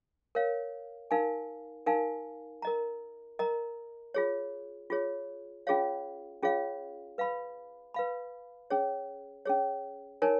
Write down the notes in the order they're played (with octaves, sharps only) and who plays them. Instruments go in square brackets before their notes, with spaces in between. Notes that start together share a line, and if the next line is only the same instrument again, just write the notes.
[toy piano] A#4 C#5 F5
D#4 A#4 F5 G#5
D#4 A#4 F5 G#5
A#4 D#5 A#5
A#4 D#5 A#5
F4 G#4 C#5
F4 G#4 C#5
C#4 F4 G#4 C#5 F5
C#4 F4 G#4 C#5 F5
B4 F5 B5
B4 F5 B5
C#4 G#4 C#5
C#4 G#4 C#5
D#4 A#4 C#5 G#5